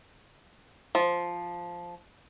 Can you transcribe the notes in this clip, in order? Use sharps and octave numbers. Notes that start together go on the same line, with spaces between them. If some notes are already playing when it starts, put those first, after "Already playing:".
F3